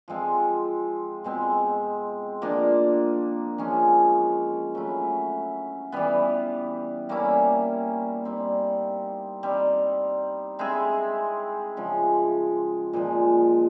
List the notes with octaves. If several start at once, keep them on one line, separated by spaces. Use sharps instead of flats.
F3 G#3 C4 F4
B2 G#3 C4
F3 A#3 D4
F3 G#3 C#4
F#3 A3 C#4 E4
E3 G3 B3
G3 A#3 C#4 E4
G3 C4 D#4
G3 C4 D#4
G#3 C4 E4 G#4
C#3 F3 G#3
A#2 F3 G#3